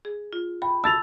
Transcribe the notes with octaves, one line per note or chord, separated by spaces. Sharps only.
G#4
F4
G5 B5
A5 E6 A6 F7